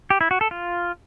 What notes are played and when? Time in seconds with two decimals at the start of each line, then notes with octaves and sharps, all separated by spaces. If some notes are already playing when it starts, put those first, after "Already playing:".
0.10 G4
0.21 E4
0.31 F#4
0.41 A4
0.51 F4